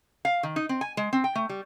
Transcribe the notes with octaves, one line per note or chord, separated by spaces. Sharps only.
F5
D#3
D#4
C4
G#5
G#3
C4
G5
A3
G3